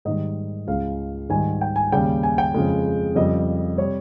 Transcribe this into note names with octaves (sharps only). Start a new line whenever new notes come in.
G#2 D#3 G3 D#5
C#2 C#3 G#3 F5
G#2 D#3 G3 G#5
G5
G#5
D#2 C#3 G3 G5
G#5
G5
F2 C#3 G#3
F2 C#3 G3 D#5
C3 G3 C#5